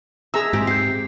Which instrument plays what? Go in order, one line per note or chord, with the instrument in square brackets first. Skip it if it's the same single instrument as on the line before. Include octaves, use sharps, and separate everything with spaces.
[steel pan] G#4 A#5 E6 [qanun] E5
[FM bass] G#2 [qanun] C4 G4
[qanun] G4 [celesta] G6 C7